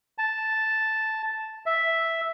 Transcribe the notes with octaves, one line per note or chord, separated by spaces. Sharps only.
A5
E5